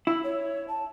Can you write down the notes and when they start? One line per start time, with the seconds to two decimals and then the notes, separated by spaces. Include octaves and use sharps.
0.07 E4 E6
0.23 C#5
0.68 A5